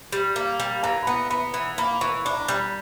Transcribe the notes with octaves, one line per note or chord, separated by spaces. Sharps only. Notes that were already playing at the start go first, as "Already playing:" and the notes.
G3
A#3
G3
E3 A#5
B5
B3 A#5
B3 B5
E3
A#3 B5
B5
E3 C#6
D4 B5
A#5
B5
G3